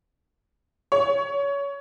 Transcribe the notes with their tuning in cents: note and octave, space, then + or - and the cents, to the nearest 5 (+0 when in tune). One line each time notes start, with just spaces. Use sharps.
C#5 +20